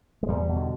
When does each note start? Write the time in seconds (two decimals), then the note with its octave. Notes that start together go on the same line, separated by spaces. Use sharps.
0.23 G#3
0.28 E2 G3
0.48 B2
0.56 D3